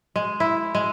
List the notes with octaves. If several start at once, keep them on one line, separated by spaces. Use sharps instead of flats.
G#3
E4
G#3